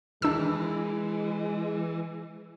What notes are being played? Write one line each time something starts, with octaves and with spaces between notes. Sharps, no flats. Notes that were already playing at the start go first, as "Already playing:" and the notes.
D#3 E3 G#3 D4 E6